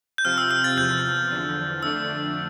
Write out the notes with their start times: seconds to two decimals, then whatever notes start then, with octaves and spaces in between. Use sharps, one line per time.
0.18 G6
0.25 C3 F3 C4 F4 F6
0.38 E6
0.51 F6
0.64 A6
0.77 E2 C3 F3 G6
1.30 E2 D3 F3
1.83 F2 D3 A3 D4 E6